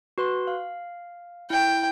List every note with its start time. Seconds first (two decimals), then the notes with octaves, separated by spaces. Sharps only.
0.18 F#4 B4 C6
0.47 F5
1.50 E4 G5